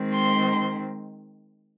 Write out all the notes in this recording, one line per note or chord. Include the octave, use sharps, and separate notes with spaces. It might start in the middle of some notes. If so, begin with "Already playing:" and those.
Already playing: D#3 G#3 C4
C6